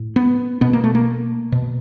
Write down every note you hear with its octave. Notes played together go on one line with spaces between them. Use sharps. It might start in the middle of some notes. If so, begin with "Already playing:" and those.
Already playing: A2
B3
B2 B3
A#3
A3
A#3
B2